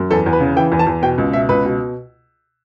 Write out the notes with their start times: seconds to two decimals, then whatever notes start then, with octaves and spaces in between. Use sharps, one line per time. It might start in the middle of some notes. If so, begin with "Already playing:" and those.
Already playing: F#2
0.11 E2 A4
0.26 E2
0.33 B4
0.40 C#3
0.56 E3 G5
0.72 E2
0.79 A5
0.87 E2
1.02 B2 G5
1.18 C#2
1.33 B2 E5
1.49 C#2 B4
1.65 B2